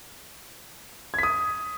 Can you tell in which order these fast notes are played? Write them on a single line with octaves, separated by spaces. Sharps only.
G#6 B6 D#6